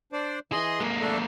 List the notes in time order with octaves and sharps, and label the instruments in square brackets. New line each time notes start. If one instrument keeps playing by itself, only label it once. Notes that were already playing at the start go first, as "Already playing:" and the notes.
[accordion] D4 C5 D5
[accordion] E3 D#5 C6 [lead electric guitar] G#4
[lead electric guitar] G#3 A#3
[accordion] A3 D4 A4